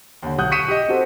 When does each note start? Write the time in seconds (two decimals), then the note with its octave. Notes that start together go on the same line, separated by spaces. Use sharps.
0.23 D#2 D3
0.38 B1 F#5 D#6 F#6 G6
0.51 C#6 D#6 B6 C#7 D#7 E7
0.68 G4 D#5
0.89 C4 F#4 G4 A4 C5